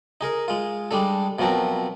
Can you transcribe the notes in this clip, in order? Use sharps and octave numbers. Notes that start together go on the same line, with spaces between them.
D#4 G#4 A#4
G#3 F4
G3 G#3 D4 A4
B2 F3 F#3 C4 A#4